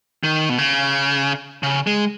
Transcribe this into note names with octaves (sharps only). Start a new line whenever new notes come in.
D#3
B2
C#3
C#3
G#3